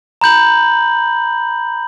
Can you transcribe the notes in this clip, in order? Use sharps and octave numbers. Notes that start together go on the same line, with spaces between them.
A#5 B5 G6 F#7